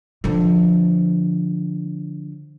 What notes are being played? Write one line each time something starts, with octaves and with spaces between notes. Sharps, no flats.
D3 F3